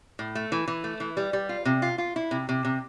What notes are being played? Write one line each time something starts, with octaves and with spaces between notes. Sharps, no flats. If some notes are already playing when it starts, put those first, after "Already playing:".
A2
A3
E3
E3
A3
E3
G3
G3
F4
C3
F4
F4
E4
C3
C3
C3